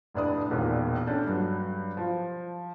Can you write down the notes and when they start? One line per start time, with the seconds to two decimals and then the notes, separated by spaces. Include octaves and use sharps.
0.14 F1 A2 D4 D5 D#6
0.50 E1 A#1 A#2 D#3
1.07 C#4 D4 A4 G6
1.27 G2 F#3
1.97 F3